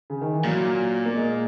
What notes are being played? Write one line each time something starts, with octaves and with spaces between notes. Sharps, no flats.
C#3
D#3
E3
A#2 F#3
A#3
G#3